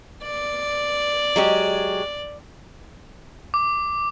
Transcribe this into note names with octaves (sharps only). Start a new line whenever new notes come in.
D5
F#3 G#3 G4
D6